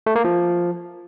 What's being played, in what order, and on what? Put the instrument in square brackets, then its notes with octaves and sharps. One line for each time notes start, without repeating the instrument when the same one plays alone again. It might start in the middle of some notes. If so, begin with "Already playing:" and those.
[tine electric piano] A3
A#3
F3